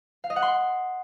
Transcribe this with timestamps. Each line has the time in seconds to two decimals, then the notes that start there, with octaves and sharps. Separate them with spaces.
0.24 F5
0.30 D#5
0.36 F#5
0.42 C6